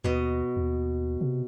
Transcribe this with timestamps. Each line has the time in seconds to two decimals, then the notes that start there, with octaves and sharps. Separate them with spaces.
0.04 D#2 B2 D#5
0.57 D#2
1.21 C3